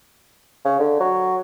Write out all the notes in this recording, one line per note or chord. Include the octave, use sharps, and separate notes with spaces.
C#3
D3
F#3